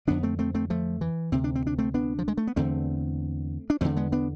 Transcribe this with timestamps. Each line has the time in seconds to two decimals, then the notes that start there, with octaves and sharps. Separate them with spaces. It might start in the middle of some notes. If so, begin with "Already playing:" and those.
0.07 F2 D3 B3 D4
0.23 A3 C4
0.39 A3 C4
0.55 A3 C4
0.70 F3 A3
1.01 E3
1.32 D2 C3 C4
1.44 D4
1.55 C4
1.67 D4
1.78 A3 C4
1.94 B3 D4
2.19 F3
2.28 G#3
2.38 A3
2.47 B3
2.56 E2 D3 A3 C4
3.70 D4
3.81 E2 D3 A3 C4
3.97 G#3 B3
4.12 B3 D4